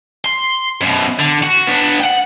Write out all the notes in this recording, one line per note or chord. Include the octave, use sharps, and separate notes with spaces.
C6
F#2 B2
D3
F#4
B3 D4
F#5 G5